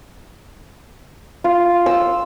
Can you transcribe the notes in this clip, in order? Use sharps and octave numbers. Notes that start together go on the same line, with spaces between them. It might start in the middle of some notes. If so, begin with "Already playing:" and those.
F4
E6